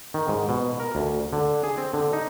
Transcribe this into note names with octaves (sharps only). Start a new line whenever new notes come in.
D#3
G#2
B2
A#4
D2
D3
G#4
C4
D3
D#4